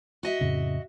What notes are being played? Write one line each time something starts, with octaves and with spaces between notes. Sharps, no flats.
F#4 D#5 E5
F2 A2 C#3